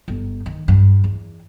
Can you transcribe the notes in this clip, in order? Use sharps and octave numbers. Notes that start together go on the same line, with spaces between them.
G1
D#3
G2
E2